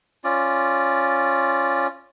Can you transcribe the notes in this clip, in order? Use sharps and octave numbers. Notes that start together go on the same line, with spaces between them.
C#4 F4 D5